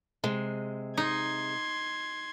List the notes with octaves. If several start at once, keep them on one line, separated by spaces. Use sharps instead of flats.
C3 G#3
D#4 C6 G#6